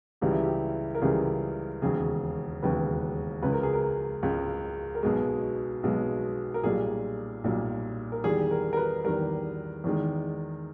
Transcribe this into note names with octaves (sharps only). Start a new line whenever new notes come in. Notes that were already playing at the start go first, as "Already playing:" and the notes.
C#2 C#3 E3 G3 G4
E4
G4
A#4
C#2 C#3 E3 G3 G#4
E1 D#2 C#3 G#4
E1 D#2 C#3 B4
C#2 C#3 G#3 B4
A#4
G#4
A#4
C#2 C#3 G#3
A#4
B1 B2 G#3 G#4
B1 B2 G#3
A#4
B1 A#2 G3 G#4
B1 A#2 G3
A#4
E2 D#3 G3 G#4
A#4
A#4
B4
E2 D#3 G3 A#4
E2 D#3 G#3